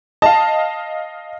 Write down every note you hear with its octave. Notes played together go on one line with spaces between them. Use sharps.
D#5 F5 A5